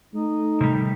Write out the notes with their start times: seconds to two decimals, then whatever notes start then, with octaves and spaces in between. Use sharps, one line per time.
0.14 A3 D#4
0.61 C3 D#3 G3